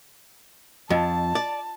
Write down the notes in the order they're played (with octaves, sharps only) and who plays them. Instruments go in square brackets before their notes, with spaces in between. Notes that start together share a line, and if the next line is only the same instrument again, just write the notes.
[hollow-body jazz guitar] F2 [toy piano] F4 D#5 [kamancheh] A5
[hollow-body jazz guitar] D5